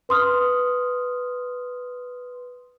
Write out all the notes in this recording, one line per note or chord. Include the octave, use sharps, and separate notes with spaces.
B4 C6 D#6 F6